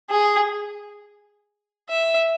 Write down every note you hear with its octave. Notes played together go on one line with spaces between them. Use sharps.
G#4
E5